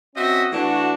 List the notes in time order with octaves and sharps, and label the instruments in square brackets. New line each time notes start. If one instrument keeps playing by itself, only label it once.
[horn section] C4 C#4 F#4 D#5 E5
E3 A3 D4 F#4